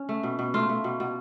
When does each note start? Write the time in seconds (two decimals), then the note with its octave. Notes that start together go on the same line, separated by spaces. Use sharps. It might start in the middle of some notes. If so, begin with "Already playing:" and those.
Already playing: C#4
0.09 A3
0.23 B2
0.39 B2
0.54 A3 F4
0.69 A3
0.84 B2
1.00 B2